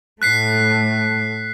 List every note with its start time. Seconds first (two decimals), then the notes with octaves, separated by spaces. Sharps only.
0.22 A2 A3 F#6 B6 C7